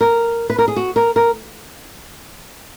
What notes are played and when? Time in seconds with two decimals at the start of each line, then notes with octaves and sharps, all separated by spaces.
0.01 A#4
0.50 B4
0.58 A#4
0.68 G#4
0.76 F#4
0.96 A#4
1.16 A#4